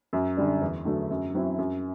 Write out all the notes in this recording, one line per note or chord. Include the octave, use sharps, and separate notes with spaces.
F#2
D3 G3 D4
E2
D3 F#3 A3
F#2
F#3 C4 E4
F#2